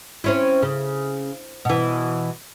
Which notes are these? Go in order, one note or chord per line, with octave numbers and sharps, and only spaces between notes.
C4 C#4 E4
C#3
B2 E3